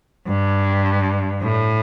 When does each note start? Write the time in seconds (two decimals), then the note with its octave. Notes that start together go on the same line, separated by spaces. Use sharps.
0.27 G2
1.42 A2